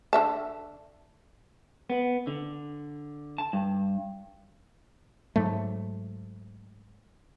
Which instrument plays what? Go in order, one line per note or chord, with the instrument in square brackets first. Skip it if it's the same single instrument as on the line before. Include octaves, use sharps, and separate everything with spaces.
[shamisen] D3 E5 A5
[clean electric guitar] B3
D3
A5
G2
[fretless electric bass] G#2 F#3 A3